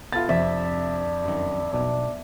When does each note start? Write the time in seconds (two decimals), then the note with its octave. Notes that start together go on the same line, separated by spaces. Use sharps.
0.13 B3 F4 A4 E5 A6
0.29 F2 C3 D4 E5
1.25 F#2 D#3
1.73 B1 B2 D4